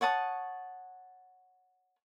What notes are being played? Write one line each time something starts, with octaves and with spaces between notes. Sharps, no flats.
C#5 F#5 A5 D#6